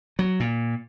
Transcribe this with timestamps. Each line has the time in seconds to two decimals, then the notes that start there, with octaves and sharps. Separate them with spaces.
0.19 F#3
0.40 A#2